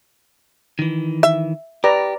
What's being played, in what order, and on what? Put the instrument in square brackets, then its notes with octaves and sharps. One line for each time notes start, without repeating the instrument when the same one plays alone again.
[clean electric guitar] D#3 E3
[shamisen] E5
[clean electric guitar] G4 [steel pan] B4 D5 A#5